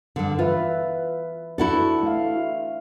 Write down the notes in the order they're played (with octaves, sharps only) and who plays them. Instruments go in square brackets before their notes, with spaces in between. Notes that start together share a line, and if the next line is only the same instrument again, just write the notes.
[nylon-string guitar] G2 D3
[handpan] E3 B4 E5 [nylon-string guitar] F4
[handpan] D4 [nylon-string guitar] E4 F#4 A4
[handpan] A3 F5